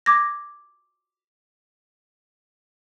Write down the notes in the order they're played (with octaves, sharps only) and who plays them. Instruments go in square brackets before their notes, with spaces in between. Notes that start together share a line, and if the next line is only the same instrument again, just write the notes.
[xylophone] D6 G#6 A#6